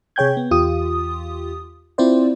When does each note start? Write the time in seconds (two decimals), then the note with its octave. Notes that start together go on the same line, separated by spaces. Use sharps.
0.16 C3 G#4 C#5 G5 G6 G#6
0.37 B3
0.51 E2 F4 G4 D#6
1.98 C4 E4 F4 C5 D5